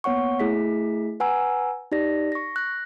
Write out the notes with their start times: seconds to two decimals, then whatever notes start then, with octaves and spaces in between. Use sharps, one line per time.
0.04 A#3 B3 C#5 F#5 C#6
0.40 A3 E4 G#4 E5 B6
1.20 B4 F#5 G#5 A#5 E6
1.92 D#4 G4 D5 A#6
2.32 C#6 A#6
2.56 F#6 A#6